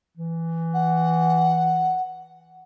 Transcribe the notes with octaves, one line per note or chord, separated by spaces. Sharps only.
E3
F#5